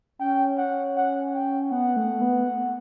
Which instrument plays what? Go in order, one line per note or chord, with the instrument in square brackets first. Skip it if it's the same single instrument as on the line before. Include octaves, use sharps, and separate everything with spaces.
[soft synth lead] C#4 [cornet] G5
[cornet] F#5
F#5
G5
[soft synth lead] B3 [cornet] F#5
[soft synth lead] A3
B3